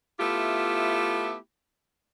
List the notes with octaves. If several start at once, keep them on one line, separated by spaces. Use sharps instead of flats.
A3 B3 E4 F4 G4